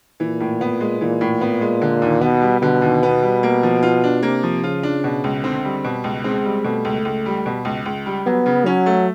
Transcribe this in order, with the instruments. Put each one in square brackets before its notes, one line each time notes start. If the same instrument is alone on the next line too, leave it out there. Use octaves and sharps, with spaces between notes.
[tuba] A#2 [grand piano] E3
[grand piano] A2
B3
G#3
[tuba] A#2 [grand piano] E3
[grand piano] A2
B3
G#3
D3
D#2
[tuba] B2 [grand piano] B3
[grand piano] G3
[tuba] B2 [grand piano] D3
[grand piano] D#2
B3
G3
A#3
F3
F4
D4
[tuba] C3 [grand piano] A#3
[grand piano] F3
[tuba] C#3 [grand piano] F4
[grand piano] D4
B2
C#2
[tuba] D3 [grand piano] C4
[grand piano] G3
B2
C#2
[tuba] G#3 [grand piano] C4
[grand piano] G3
[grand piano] B2 [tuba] A3
[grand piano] C#2
C#2
G3
B2
C#2
C#2
G3
[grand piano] F#3 [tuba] B3
[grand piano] C#3
[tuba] F#3 [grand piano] C#4
[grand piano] A3